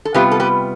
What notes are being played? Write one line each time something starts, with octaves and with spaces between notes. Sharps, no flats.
A4
C3 G3 B3 F4 G4 B4
A4
G4 B4